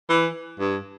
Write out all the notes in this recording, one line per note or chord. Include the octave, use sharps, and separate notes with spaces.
E3
G2